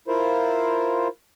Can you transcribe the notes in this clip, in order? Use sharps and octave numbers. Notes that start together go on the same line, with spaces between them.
E4 F4 A#4 C5